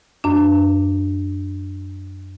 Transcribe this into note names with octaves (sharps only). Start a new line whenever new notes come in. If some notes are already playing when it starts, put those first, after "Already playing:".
F#2 D4